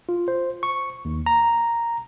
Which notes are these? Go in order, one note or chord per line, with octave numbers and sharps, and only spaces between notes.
F4
C5
C#6
D#2
A#5